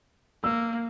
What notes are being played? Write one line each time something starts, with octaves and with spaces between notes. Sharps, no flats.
A#3 E6